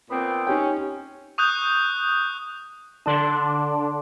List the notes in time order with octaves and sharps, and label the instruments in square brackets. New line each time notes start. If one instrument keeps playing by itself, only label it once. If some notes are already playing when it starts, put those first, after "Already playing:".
[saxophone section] A#2 B3 C4
[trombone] C#4 [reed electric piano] D#4 G4 G5
[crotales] C#6 D#6 F#6 G6
[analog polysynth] D3 D4 [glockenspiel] A5 C6